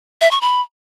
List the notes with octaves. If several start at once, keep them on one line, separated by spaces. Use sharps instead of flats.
E5
C#6
B5